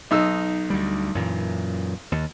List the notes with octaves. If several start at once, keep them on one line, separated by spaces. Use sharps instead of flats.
B1 D#4 E6
D2 G3
F#2 A#2 E3
D#2